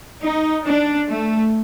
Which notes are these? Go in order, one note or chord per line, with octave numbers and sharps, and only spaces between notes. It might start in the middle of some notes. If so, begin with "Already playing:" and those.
D#4
D4
A3